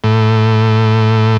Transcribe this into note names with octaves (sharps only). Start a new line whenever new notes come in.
A2